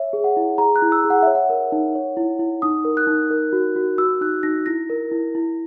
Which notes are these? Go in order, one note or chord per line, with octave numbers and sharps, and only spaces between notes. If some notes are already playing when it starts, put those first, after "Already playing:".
Already playing: C#5 E5
G#4
F#5
E4
G#4 A#5
F#6
E4
E6
G#4
F#5
C#5 E5
F#5
A#4
D#4
C#5
E4
E4
D#4 D#6
A#4
F#6
D#4
A#4
F#4
F#4
F#4 E6
D#4 F#6
D#4 A#6
E4 A#6
A#4
E4
E4